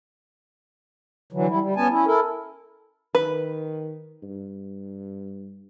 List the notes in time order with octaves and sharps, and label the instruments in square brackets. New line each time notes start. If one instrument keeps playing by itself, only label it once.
[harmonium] D3 E3 F#3
G3 E4
G3
B3 C#4 G#5 A5
C#4 E4
E4 A4 A#4
[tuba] D#3 [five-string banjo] B4
[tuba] G2